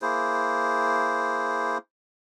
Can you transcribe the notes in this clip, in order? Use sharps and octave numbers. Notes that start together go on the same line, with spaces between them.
A#3 E4 G#4 C5